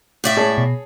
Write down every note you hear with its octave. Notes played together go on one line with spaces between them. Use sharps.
A2 D5 E5
G#4 C#5 A5
B2